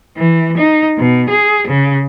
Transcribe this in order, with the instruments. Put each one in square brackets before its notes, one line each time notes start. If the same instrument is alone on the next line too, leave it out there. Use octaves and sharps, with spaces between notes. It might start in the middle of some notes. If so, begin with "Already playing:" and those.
[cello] E3
D#4
B2
G#4
C#3